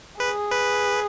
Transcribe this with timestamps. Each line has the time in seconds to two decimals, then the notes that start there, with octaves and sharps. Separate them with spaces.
0.20 G#4 B4
0.52 B4